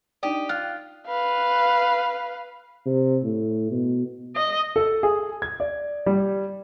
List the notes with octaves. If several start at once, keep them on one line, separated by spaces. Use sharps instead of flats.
D4 D#4 G4 D5 D#5
F4 G5 F6 F#6
B4 F5
C3
A2
B2
D#5
A4
G#4
G#6
D5
G3